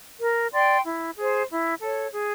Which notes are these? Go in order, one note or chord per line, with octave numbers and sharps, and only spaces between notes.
A#4
D5 G5 C6
E4
G#4 C5
E4
A4 C#5
G#4